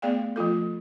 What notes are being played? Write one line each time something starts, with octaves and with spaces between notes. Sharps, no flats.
A3 B3 G#4 D5 F5 G5
F3 A3 F4 A4